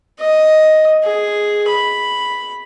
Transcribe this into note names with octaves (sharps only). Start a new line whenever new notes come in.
D#5
G#4
B5